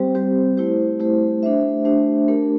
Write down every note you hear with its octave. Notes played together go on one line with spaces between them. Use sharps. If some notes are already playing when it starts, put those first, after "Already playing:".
Already playing: G3 C4 G4 C5
G3 C4 G4 C5
A3 E4 G4 C5
A3 E4 G4 C5
A3 D4 G4 C5 E5
A3 D4 G4 C5 E5
A3 D4 G4 A#4